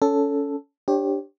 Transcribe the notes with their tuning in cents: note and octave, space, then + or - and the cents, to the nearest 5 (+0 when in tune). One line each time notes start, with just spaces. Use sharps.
C#4 +20 A4 +0
D4 +0 G4 +0 C#5 -40